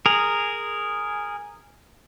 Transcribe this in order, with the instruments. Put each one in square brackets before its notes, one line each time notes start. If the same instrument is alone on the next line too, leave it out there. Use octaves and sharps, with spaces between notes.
[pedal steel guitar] G#4 A#4